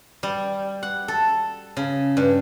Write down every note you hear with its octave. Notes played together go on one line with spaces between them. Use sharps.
G3
F#5
A4
C#3
G2